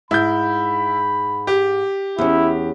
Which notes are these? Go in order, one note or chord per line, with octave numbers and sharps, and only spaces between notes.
G#2 E4 B5 G6
G4
E2 C#4 E4